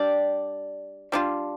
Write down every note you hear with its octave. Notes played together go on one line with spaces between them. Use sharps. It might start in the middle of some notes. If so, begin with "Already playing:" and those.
Already playing: G3 D4 G4 D5
G3 D4 F4